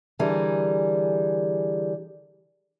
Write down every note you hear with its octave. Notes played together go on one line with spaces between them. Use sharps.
D3 E3 G3 G#4 A#4